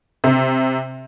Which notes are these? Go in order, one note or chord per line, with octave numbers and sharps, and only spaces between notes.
C3